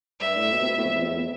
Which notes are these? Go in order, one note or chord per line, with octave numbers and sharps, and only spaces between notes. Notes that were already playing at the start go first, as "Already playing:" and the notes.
G2 E5
A2
B2
C3
B2
A2
F2
E2
F2
E2